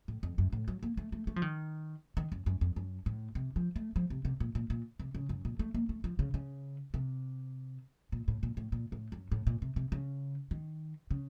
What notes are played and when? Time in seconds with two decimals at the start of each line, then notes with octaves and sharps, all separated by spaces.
0.08 A2
0.23 F2
0.38 F#2
0.53 A2
0.68 F#3
0.83 A#3
0.97 A3
1.12 A3
1.27 A3
1.36 F3
1.42 D#3
2.17 D#3
2.32 F#2
2.46 F#2
2.61 F2
2.76 F#2
3.06 A2
3.35 C3
3.56 F3
3.76 A3
3.96 F3
4.10 C3
4.25 C3
4.40 A#2
4.55 A#2
4.70 A#2
5.00 C3
5.15 C#3
5.29 F#2
5.45 A#2
5.59 A3
5.74 A#3
5.89 A3
6.04 F3
6.19 C#3
6.34 C#3
6.94 C3
8.12 A#2
8.28 A2
8.43 A#2
8.57 A2
8.72 A#2
8.92 A2
9.12 F#2
9.32 A2
9.47 A#2
9.62 C3
9.76 C3
9.92 C#3
10.51 D#3
11.11 C#3